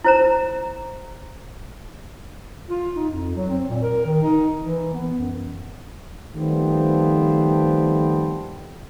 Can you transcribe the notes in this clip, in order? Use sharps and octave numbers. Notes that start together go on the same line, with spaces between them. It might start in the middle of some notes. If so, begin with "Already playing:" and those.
E4 C5 A#5
F4
D#4
F2
F#3
C4
A#2
A#4
D#3
D#4
E3
B3
F#2
D#3 F3 G3 A3 B3 C4